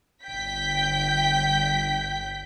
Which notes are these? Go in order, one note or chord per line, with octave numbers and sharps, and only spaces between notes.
G1 G5 G6 B6